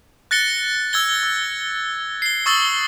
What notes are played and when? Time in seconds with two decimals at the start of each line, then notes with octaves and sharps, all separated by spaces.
0.31 F#6 A6 A#6 C#7 G7
0.93 E6 G#6 G7
1.23 E6
2.22 C7 G7
2.46 C#6 D#6 E6 A6 F#7 G7